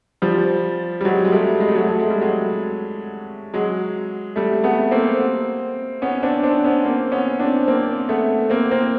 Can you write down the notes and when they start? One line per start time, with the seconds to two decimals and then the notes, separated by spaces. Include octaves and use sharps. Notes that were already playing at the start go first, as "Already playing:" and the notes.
0.22 F3 G3
1.01 G3
1.05 F#3 G#3
1.25 G#3
1.32 G3 A3
1.60 G#3
1.68 A3
1.75 F#3 G#3
1.87 A3
1.99 G#3
2.11 G3
2.21 F#3 G#3
3.54 F#3 G#3
4.36 G3 A3
4.64 A3 B3
4.91 A#3 C4
6.02 B3 C#4
6.23 C4 D4
6.43 C4 D4
6.64 B3 C#4
6.85 A#3 C4
7.12 B3 C#4
7.39 C4 D4
7.67 A#3 C4
8.09 A3 B3
8.50 A#3 C4
8.71 A#3 C4